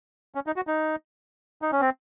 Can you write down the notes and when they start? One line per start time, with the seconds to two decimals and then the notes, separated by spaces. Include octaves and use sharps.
0.35 C#4
0.47 D#4
0.56 F#4
0.67 D#4
1.62 D#4
1.72 C#4
1.81 C4